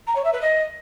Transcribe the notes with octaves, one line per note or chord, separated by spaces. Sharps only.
A#5
C#5
E5
B4
D#5